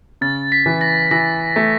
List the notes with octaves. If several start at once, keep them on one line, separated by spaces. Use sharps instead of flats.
C#3 A6
B6
E3
A#6
E3 A#6
A3